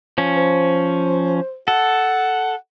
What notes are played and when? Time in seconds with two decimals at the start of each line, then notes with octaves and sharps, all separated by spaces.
0.18 F3 C#4
0.36 C5
1.68 A4 F#5